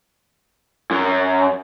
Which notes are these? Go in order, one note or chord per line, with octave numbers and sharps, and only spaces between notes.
F#2